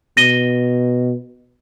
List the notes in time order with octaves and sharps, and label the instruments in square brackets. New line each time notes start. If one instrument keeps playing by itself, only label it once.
[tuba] B2 [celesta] A#6 D#7 G7